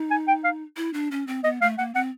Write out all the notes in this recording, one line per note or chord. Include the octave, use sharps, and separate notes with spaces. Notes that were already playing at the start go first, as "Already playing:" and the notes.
Already playing: D#4
G#5
G5
F5
E4
D4
C#4
C4
B3 D#5
A3 F5
A#3 F#5
C4 F#5